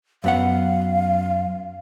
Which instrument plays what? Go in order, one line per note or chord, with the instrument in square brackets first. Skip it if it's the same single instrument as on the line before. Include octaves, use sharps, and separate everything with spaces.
[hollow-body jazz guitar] F#2 B3 F#5 [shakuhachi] F5